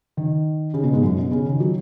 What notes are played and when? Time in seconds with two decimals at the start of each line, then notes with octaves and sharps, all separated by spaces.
0.17 D#3
0.74 C#3
0.83 B2
0.93 G#2
1.03 F#2
1.17 B2
1.31 C#3
1.46 D#3
1.60 F#3